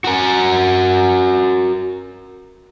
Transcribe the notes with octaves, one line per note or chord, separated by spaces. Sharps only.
F#4 A#4